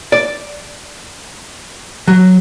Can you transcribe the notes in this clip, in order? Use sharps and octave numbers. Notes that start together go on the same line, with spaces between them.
D5
F#3